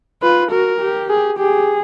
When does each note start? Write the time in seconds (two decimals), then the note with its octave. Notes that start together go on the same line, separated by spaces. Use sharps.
0.22 F4 B4
0.51 F#4 A#4
0.81 G4
1.10 G#4
1.39 G4 G#4